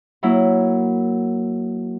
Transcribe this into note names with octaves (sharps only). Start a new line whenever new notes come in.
F#3 A#3 E4